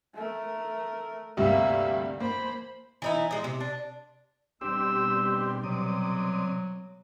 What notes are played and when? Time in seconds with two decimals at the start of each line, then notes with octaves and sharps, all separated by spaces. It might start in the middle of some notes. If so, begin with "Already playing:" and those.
0.14 A3 A#4
1.37 D2 G2 C3 A#3 E5
2.20 A#3 C5 B5
3.02 E3 D#4 E4
3.31 G#3 D#5
3.44 C3
3.60 D4
4.61 B2 G3 C4 D4 G4 E6
5.63 C3 F#3 D5 D#6